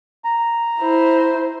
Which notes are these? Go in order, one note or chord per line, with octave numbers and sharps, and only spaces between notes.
A#5
E4 C5